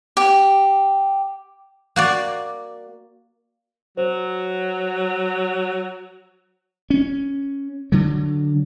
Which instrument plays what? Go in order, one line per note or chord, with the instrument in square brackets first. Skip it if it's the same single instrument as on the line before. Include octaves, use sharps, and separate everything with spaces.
[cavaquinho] G4
[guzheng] A#3 F#4 D5
[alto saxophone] F#3 [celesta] C5
[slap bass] C#4
D3 F#3